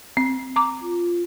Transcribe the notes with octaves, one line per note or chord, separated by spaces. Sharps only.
C4
A#5 D6
F4